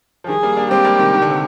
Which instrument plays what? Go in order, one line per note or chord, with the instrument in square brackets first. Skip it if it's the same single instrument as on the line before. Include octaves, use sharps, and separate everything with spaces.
[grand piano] F3
[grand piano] D#3 G3 [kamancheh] G#4
[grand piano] G3 A#3
A#3 D4
[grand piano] G#3 C4 [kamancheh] G4
[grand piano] G3 A#3
C3 D#3
D#3
D3
C3